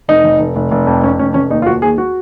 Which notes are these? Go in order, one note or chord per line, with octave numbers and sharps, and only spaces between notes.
F1 D#4
F1
F1
F1
F1
F2
F2 C#4
F1 C#4
F1 C#4
D#2 D#4
F4
D#2 F#4
D#2 G#4
F#4